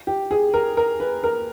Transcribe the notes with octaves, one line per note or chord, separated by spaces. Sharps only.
G4
G#4
A#4
A#4
B4
A#4